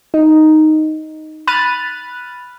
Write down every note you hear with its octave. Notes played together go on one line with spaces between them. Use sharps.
D#4
B5 F6 F#6 A6 D#7